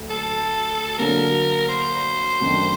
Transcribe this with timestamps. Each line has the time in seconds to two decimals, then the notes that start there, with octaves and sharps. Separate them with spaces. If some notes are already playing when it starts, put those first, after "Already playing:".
Already playing: D2 F#3 A3
0.10 A4
0.98 D3 F#3 A#3 A#4
1.69 C5
2.40 F#2 D#3 A3 D4 F#4